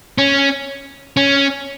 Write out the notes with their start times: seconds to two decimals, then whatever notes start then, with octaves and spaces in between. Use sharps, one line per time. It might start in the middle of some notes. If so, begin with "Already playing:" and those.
0.18 C#4
1.17 C#4